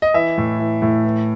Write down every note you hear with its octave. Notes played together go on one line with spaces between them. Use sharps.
D#5
E3 E5
A2
E3
A2
E3